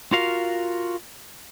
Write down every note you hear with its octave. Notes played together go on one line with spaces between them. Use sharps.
F4 F#4 A#4 F5